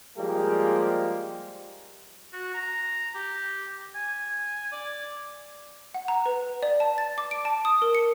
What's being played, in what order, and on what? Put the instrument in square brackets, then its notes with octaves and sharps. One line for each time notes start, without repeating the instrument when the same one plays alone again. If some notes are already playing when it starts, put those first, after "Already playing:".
[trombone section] F3 G3 G#3 A#3 G4 G#4
[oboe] F#4
A#5
G4
G#5
D5
[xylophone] F#5
A#5
B4
D5
A5
A6
D6
D7
A5
D#6
A#4
C#7